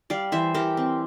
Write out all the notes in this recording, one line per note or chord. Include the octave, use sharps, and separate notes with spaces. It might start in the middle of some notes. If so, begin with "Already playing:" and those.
G3 D5 F5
E3 C5 E5
E3 G4 A#4
C4